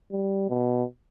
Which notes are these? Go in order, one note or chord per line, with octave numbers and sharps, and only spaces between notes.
G3
B2